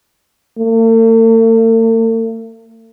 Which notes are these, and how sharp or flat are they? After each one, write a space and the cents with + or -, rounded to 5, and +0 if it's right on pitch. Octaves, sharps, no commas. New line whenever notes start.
A3 +45